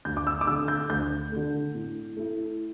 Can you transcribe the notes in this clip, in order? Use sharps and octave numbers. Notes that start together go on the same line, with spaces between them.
D2 G6
D6
E6
D6
D3 A3 E6
G6
D2 G6
D3 A3
A2
A3 E4